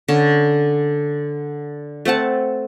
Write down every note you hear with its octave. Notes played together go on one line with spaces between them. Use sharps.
D3 C#4 A5
A3 C4 F#5 A5